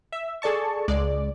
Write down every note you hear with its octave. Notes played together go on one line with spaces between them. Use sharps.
E5
G#4 A4 D5 A5 C#6
C#2 G#3 D5